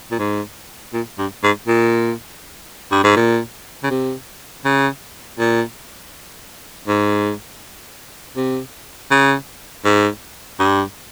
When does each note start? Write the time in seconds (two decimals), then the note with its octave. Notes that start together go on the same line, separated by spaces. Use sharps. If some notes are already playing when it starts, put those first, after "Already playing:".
0.11 A#2
0.19 G#2
0.93 A#2
1.18 G2
1.43 G#2
1.68 A#2
2.91 G2
3.04 G#2
3.16 A#2
3.83 C#3
3.90 C3
4.65 C#3
5.39 A#2
6.87 G#2
8.36 C3
9.11 C#3
9.85 G#2
10.59 G2